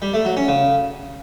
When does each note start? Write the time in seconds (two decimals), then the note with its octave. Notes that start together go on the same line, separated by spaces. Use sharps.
0.02 G3
0.13 A3
0.25 F#3
0.37 C#4
0.48 C#3